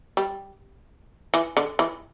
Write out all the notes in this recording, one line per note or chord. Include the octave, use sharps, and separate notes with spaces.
G3
E3
D3
E3